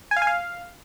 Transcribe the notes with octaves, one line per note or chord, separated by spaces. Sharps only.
G#5
F5
G#5
F5